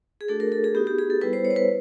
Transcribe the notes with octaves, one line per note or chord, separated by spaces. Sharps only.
G#4
A3 D4 F#4 A4
A#4
A4
G#4
B3 D#4 F#4 G4
G4
G#4
A4
G3 B3 E4 B4
C5
C#5
C5
B4